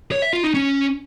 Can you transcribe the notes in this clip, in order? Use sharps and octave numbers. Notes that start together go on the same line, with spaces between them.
C#5
E5
F4
D#4
C#4